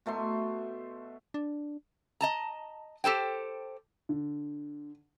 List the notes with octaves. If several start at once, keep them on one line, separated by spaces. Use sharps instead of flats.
B2 A3 E5 C6
D4
D#5 A5 A#5
G4 A4 C5 G5
D3